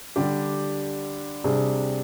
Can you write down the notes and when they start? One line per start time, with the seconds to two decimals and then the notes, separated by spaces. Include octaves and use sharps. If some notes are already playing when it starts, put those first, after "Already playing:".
0.16 D3 G3 D4 G4
1.44 C3 G3 D4 G#4